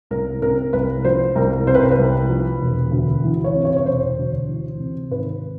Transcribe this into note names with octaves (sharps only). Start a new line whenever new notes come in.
C2 A#4
C3 A#4
C2 B4
F3 C5
C2 A#4
C3 C5
B4
A#4
B4
C2
F3
E1
D2
E3
C#5
C3
C#5
C#5
E1 C5
D2
E3
C3
G#1 B4